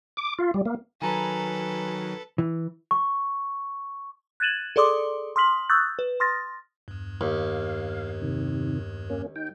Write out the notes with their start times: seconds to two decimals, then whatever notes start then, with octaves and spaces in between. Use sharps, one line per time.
0.17 D6
0.39 F4
0.54 G3
0.66 A#3
1.02 D#3 F#3 A4 B4 G#5 A#5 B5
2.38 E3
2.91 C#6
4.40 F#6 G#6 A6 D#7 E7 F#7
4.76 G#4 A4 D5 C6 D6 D#6
5.36 C6 D#6 F6 B6 F#7
5.70 C#6 D#6 E6 F#6 G6 A6
5.99 B4
6.20 C6 D#6 F6 A6 A#6
6.88 E2 G2
7.21 D#2 F5
8.22 C3 D#3
9.10 A#3 C#4
9.36 D#4 G5